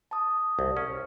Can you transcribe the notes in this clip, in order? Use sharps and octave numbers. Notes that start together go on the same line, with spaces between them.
A5 D#6
C2
C#4